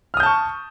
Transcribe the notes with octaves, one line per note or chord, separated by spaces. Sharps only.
A5 C#6 D#6 F6 G6